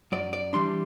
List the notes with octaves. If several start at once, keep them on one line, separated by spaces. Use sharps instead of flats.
F#2 D5
D5
E3 G3 D4 C6